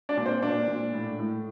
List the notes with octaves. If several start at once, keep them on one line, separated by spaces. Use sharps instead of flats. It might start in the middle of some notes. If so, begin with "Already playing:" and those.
D4 D5
A#2
C4 C5
A#2 D4 D5
A#2
A2
A2